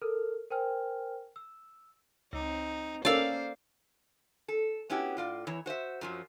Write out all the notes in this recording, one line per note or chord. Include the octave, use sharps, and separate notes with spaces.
A4 A#4 F6
A#4 C5 G5 G#5 F6
E6
C#2 C4 D#4
A#3 C#4 A4 A#4 C5 D5 F5 E6
A4
B3 C#4 E4 F#4 G4
A2 F4 D5
E2 E3 E4 C#5
F#4 C5 D#5 E5
F#2 F3 F#3